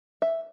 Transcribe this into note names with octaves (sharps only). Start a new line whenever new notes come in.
E5